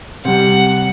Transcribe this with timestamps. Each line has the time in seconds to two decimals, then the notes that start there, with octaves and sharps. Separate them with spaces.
0.25 C3 G3 F#5